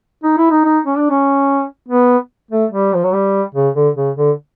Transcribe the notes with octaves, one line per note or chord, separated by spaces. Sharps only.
D#4
E4
D#4
D#4
C#4
D4
C#4
B3
A3
G3
F3
F#3
G3
C#3
D3
C#3
D3